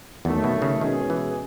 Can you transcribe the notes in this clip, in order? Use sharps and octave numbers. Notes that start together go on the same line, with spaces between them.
E2 D#3 F#3 A3
B2
C#3
B2 D#3 G#3 C#4 G#4
E3